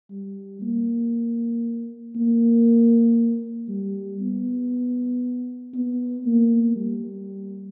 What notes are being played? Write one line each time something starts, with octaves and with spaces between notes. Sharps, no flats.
G3
A#3
A#3
G3
B3
B3
A#3
G3